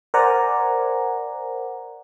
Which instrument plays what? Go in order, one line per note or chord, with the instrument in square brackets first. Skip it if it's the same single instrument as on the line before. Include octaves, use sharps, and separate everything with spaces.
[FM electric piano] A#4 C5 D5 F#5 G#5 A#5